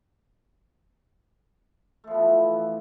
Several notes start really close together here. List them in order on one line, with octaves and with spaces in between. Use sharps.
A3 F3 B3 E3